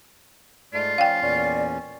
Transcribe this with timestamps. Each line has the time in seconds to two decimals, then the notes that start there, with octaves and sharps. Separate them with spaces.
0.73 G#2 A3 F4 D5
0.98 F3 C#4 F5 G5
1.22 E2 A#2 C#4 D5